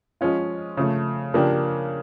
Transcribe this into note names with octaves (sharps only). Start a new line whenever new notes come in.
F3 G#3 C#4 F4
C#3 F3 A3
C#3 F3 A#3 D4 G4